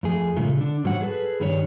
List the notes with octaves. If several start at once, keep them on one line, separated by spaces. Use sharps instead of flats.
F2 A3 G#4
A#2 C#3 G#3 A3 F4
D3 D4
G#2 F#3 G3 C#5 F#5
G#4 A4 B4
G2 D#3 G3 D4 G#4 C#5